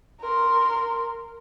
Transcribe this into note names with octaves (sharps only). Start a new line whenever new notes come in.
A#4 C6